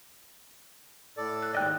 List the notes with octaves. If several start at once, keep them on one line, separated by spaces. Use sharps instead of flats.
A2 A4 D5
F#6
D#2 G#2 D5 D#5 G5 F#6